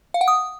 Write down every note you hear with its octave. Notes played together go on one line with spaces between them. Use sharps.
F5
F#5
D#6